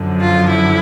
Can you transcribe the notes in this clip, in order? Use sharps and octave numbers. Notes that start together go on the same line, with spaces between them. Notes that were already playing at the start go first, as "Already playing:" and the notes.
Already playing: F#2 D3 F3
F4
E4